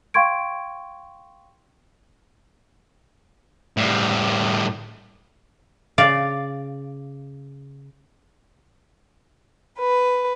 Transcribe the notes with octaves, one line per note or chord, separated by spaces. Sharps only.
F5 G5 C6 C#6 G#6 D7
A2 G3
C#3 D5 F5
B4